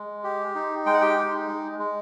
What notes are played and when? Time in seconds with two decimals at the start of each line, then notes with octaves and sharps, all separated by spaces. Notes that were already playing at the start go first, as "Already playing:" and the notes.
Already playing: G#3
0.24 G4
0.55 D#4
0.86 G#3 G5
0.94 F#5
1.01 G4 G5
1.17 D#4
1.48 G#3
1.79 G#3